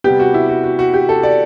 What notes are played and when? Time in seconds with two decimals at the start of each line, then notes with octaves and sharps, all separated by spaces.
0.04 C3 G3 B3 G4
0.20 F#4
0.34 E4
0.49 F#4
0.64 F#4
0.79 F#4
0.94 G4
1.09 A4
1.23 D5